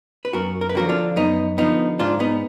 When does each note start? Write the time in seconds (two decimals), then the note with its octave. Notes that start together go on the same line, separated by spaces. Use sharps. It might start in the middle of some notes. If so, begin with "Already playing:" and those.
0.25 B4
0.33 F#2 F#4 A#4
0.61 A#4
0.69 B4
0.75 D3 F3 F#4 A#4
0.89 D4 F4
1.16 F#2 B3 D#4
1.58 D3 F3 B3 D#4
1.99 G#2 D4 F4
2.20 B3 D#4